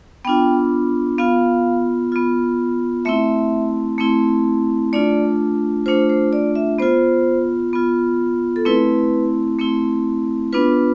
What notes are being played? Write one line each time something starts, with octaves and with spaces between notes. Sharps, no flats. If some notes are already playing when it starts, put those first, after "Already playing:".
B3 D4 F4 G5
B3 F4 F5
B3 F4
A3 C4 E4 E5
A3 C4 E4
A3 D4 F4 D5
A3 D4 F4 C5
C5
D5
E5
B3 F4 C5
B3 F4
A4
A3 C4 E4 B4
A3 C4 E4
B3 D4 F4 B4